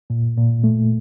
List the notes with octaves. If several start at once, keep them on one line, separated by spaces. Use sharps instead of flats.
A#2
A#2
A3